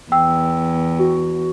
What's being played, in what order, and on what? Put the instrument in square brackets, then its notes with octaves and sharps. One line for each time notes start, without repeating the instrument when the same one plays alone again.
[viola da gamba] E2 [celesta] G5 E6
[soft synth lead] F#4